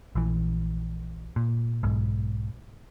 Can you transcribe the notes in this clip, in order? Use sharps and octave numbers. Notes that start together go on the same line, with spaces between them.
A#1 E3
A#2
B1 G#2